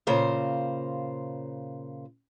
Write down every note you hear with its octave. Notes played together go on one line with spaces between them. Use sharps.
A#2 C#3 C5 F5